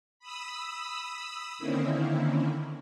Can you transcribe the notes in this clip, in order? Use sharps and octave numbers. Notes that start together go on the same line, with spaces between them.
B5 D#6 E6
D3 D#3 A#3 C4 C#4 E4